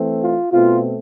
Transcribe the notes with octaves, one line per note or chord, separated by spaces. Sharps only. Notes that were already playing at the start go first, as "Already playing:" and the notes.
Already playing: E3 A3 C4
F4
B2 A3 C4 F4